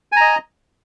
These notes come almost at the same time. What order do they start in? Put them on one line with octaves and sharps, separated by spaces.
G#5 A#5 D#5